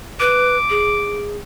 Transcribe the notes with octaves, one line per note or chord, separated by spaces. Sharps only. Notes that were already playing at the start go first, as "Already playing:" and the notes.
B4 D6
G#4